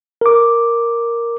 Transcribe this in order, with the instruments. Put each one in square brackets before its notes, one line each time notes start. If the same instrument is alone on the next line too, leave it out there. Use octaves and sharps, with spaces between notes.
[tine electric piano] A#4 D6